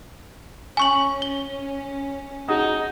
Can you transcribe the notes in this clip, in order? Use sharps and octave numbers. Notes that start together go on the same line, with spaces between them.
C#4 G#5 C#6 F#7
G7
D#4 F#4 G#4 D#6